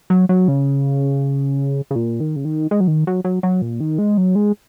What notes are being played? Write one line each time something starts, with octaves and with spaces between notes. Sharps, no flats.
F#3
F#3
C#3
C#3
A#2
D#3
C#3
D#3
G#3
F#3
D#3
F#3
F#3
F#3
A#2
D#3
G#3
F#3
G#3